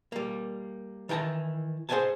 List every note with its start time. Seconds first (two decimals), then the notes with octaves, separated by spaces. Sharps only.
0.12 G3 A#3
1.09 D#3 E3 G5 A5 A#5
1.89 G#4 C5 E5 F#5 G#5 A5